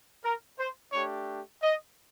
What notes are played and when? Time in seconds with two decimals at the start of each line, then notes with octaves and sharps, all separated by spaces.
0.23 A#4
0.58 C5
0.92 A3 D4 G4 C#5
1.61 D#5